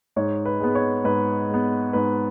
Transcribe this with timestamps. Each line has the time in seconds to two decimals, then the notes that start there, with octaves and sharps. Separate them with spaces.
0.16 G#2 C#5
0.46 B4
0.60 G#3 B3
0.75 C#5
1.04 G#2 B4
1.49 G#3 B3
1.93 G#2 B4